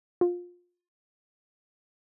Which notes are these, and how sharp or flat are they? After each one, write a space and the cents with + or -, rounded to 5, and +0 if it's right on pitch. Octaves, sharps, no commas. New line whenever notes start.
F4 +20